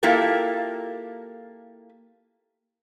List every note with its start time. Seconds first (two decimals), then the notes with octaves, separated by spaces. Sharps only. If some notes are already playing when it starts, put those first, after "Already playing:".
0.03 A#3 E4 F4 G4 A4 A#4